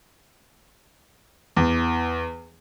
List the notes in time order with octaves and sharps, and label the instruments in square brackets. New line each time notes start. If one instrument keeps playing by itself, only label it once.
[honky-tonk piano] E2